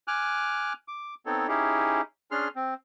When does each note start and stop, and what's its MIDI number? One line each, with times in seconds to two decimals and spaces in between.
0.08 0.73 80
0.08 0.73 86
0.08 0.73 89
0.08 0.73 90
0.88 1.14 86
1.26 1.47 59
1.26 1.47 60
1.26 1.47 63
1.26 1.47 69
1.26 1.47 73
1.48 2.01 61
1.48 2.01 63
1.48 2.01 64
1.48 2.01 67
1.48 2.01 68
2.31 2.48 61
2.31 2.48 62
2.31 2.48 68
2.31 2.48 84
2.31 2.48 89
2.56 2.74 60